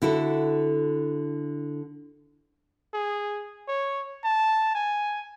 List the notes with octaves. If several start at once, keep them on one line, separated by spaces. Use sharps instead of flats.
D3 E4 F#4 A4
G#4
C#5
A5
G#5